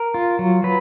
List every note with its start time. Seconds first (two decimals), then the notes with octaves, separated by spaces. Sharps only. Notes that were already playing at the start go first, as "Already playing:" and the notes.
Already playing: A#4
0.14 F4
0.39 F#3
0.64 F#3 B4